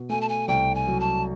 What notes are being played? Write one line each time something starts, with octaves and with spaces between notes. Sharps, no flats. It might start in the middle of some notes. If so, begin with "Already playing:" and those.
Already playing: B2
A3 G#5
A5
G#5
C2 G5
G#5
F#3
A5